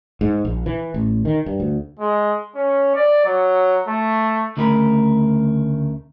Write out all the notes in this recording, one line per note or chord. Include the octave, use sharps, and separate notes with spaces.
G#2
A#1
E3
A1
D#3
G2
D2
G#3
C#4
D5
F#3
A3
D2 C#3 A3 A#4 B4 B5